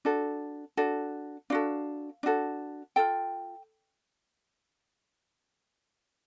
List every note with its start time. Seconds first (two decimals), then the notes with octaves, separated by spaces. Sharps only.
0.05 D4 F#4 A4
0.77 D4 F#4 A4
1.50 D4 F#4 A4 F5
2.23 D4 F#4 A4
2.96 F4 A4 G5